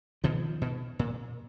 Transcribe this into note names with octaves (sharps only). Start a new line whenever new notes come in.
B2 D#3 F3
B2
A#2